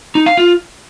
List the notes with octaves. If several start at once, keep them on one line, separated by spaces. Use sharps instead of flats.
D#4
F5
F4